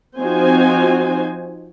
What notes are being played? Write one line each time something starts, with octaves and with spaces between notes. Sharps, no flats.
F3 C4 D#4 F#4 C5 G#5